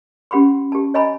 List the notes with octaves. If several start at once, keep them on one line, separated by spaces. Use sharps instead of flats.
C#4 G4 F#5 B5 C6
G4 A5
C#5 D#5 G#5 A#5 B5